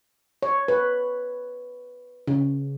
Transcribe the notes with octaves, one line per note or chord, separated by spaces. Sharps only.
C#5
B4
C#3